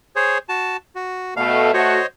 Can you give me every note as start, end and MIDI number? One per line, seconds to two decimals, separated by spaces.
0.16 0.38 68
0.16 0.38 72
0.16 0.38 73
0.49 0.77 66
0.49 0.77 81
0.95 1.34 66
1.37 1.72 47
1.37 1.72 57
1.37 1.72 77
1.74 1.98 57
1.74 1.98 66
1.74 2.06 72
1.74 2.06 73
1.74 2.06 75